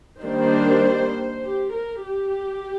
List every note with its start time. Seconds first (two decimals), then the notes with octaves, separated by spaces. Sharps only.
0.21 D#3 G3 A#3 D4 C5
1.44 G4
1.74 A#4
2.05 G4